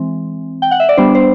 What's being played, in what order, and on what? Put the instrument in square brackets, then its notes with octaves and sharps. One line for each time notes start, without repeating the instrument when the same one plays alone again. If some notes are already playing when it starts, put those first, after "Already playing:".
Already playing: [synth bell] E3 G#3 C4
G5
F#5
E5
D5
G3 B3 D4 C5
C5